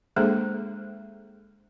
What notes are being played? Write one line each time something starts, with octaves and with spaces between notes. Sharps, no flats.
G#3 A#3 D4 G#4 A4 C5